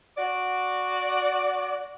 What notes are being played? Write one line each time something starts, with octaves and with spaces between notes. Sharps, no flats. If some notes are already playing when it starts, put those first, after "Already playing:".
F#4 D5